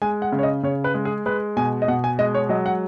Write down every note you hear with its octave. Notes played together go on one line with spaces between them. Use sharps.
G#3 G#5
F#5
C#3
C#5
D#5
C#3 C#5
B4
G#3
G#4
G#3 B4
B2 G#5
D#5
B2 F#5
G#5
G#3 D#5
C#5
F#3 D#5
F#5